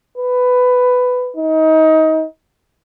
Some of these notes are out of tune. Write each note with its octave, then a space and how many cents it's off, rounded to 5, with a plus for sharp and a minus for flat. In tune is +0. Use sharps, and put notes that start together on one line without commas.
B4 +15
D#4 +25